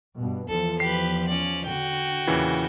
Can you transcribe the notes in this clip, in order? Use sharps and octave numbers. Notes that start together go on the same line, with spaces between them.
G2 B2
E2 F3 A4
G4 B4 C7
C#4 D5
D3 F#4 G5
E2 A#2 C#3 E3